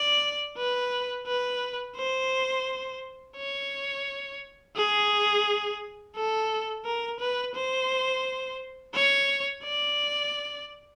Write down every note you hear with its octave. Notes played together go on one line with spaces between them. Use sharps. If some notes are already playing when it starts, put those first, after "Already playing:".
Already playing: D5
B4
B4
C5
C#5
G#4
A4
A#4
B4
C5
C#5
D5